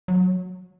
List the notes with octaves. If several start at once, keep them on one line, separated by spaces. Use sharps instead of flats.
F#3